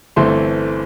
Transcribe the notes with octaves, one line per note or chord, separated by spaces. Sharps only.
G1 E3 A3 C4 C6